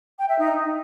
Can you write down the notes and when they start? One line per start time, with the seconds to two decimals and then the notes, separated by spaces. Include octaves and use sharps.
0.19 G5
0.29 E5
0.39 D#4